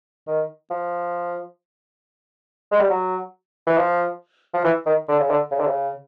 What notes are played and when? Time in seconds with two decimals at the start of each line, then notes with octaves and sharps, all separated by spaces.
0.27 D#3
0.70 F3
2.72 G#3
2.80 G3
2.90 F#3
3.67 E3
3.77 F3
4.54 F3
4.64 E3
4.86 D#3
5.09 D3
5.20 C#3
5.30 D3
5.51 C#3
5.60 D3
5.67 C#3